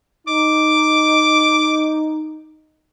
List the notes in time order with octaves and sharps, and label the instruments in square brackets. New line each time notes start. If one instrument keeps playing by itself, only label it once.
[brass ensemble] D#4 [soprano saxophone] D6